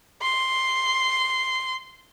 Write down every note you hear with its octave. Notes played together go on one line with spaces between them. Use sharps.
C6